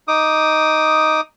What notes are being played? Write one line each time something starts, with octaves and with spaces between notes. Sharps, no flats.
D#4 D6 D#6